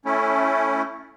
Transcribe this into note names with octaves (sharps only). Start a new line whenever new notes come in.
A3 C#4 E4